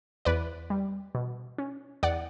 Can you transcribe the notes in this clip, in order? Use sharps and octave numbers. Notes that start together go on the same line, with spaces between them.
E2 B4 D5
G3
B2
C#4
E2 D5 F#5